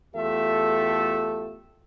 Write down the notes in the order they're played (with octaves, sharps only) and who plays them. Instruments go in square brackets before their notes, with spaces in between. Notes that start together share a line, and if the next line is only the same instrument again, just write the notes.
[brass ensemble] E2 A3 F4 G4 A4 E5